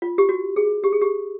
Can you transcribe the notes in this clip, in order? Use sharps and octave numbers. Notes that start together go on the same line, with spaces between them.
F4
G4
F#4
G#4
G4
G#4
G4